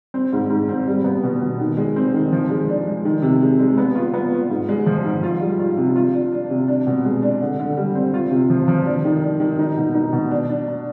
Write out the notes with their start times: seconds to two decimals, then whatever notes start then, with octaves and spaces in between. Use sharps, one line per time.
0.14 C4
0.33 G#2
0.50 G#2
0.69 C4
0.87 G3
1.04 B3
1.24 B2
1.42 B2
1.60 D#3
1.77 G#3
1.96 C4
2.14 D#3
2.32 F3
2.50 G#3
2.69 D4
2.87 G#3
3.05 D#3
3.22 C3
3.42 G#3
3.60 G#3
3.78 B3
3.96 F4
4.14 B3
4.33 F4
4.50 G#2
4.69 G#3
4.86 F3
5.04 G#2
5.23 F4
5.41 G3
5.59 F4
5.78 C3
5.96 F4
6.14 D4
6.32 D4
6.50 C3
6.68 D4
6.87 B2
7.05 G#3
7.22 D4
7.41 D3
7.59 D3
7.77 G3
7.95 C4
8.14 F4
8.31 C3
8.50 F3
8.68 F3
8.86 D4
9.05 D#3
9.22 D4
9.40 D#3
9.59 D#4
9.77 B2
9.95 D#4
10.13 B2
10.31 D4
10.50 D4
10.68 D4